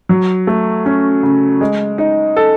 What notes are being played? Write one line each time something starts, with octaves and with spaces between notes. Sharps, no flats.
F#3
A3
C#4
C#3
G#3
D#4
A4